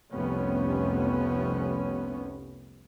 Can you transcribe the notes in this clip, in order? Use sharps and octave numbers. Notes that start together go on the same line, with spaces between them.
F1 C2 C3 B3 C#4